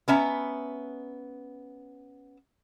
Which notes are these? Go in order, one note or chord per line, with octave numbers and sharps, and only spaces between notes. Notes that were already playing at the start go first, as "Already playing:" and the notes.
B3 C#4 E5 A#5